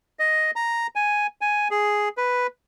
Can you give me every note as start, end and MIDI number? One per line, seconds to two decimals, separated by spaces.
0.19 0.51 75
0.56 0.87 82
0.95 1.27 80
1.41 1.68 80
1.71 2.09 68
2.17 2.47 71